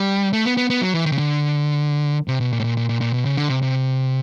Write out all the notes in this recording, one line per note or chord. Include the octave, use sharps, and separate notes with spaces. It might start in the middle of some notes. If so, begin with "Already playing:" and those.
Already playing: G3
A3
B3
B3
B3
F#3
E3
D#3
C#3
D3
C3
B2
A#2
A2
A#2
A#2
A#2
A#2
B2
C#3
D3
C3
C3